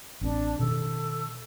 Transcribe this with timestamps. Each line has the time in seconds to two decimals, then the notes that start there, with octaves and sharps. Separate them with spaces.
0.21 A1 C4 D4
0.59 B2 D#3 A4